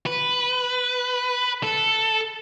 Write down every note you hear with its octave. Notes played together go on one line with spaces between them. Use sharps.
B4
A4